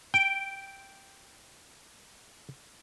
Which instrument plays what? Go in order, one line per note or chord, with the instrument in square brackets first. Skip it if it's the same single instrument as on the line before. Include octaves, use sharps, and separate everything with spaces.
[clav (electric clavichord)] G5 [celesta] D7